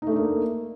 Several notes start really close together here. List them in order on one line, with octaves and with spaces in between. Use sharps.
D#4 A3 D4 A#3